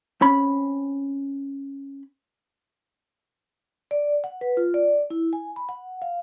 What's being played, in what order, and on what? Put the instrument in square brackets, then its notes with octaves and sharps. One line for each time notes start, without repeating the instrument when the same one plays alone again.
[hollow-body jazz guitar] C4 C#4 B5
[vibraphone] D5
F#5
B4
F4
D5
E4
G#5
B5
F#5
F5